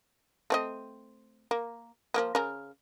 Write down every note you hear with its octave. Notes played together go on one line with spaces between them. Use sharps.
A3 C4 D#5
A#3
F3 A#3 B3
C#3 A#4